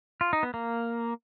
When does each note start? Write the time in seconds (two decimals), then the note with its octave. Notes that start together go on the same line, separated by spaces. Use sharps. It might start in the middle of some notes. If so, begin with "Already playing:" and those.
0.21 F4
0.33 D#4
0.43 B3
0.54 A#3